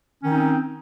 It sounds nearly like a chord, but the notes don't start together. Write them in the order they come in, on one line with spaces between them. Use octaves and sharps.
C#4 D#3 D#4 C4